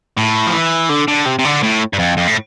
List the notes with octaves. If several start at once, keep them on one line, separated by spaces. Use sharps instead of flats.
A2
F3
E3
D3
D3
C3
C3
D3
A2
G2
F2
F2
A2